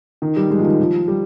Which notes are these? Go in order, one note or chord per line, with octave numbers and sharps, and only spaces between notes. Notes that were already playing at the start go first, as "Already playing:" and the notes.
D#3
G3
G#3
F3
D#3
F3
G3